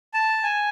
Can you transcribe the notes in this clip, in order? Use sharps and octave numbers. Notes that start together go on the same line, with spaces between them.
A5
G#5